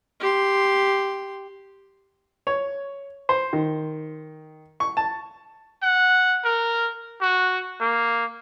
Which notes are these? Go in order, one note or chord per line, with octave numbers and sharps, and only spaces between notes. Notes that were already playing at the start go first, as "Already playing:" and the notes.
G4 C6
C#5
C5
D#3
C#6
A5
F#5
A#4
F#4
A#3